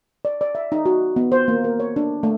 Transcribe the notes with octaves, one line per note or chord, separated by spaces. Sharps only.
D5
D5
E5
D#4
F#4
B3
C5
A#3
A#4
C#5
D4
A3